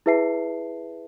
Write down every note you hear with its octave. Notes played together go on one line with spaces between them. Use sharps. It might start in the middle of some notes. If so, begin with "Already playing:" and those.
E4 G#4 B4 E5 A5 C7